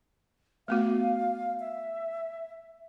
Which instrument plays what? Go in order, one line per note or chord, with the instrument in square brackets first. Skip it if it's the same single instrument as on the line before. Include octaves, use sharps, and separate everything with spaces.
[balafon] A3 B3 F#4 [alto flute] F5
[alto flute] E5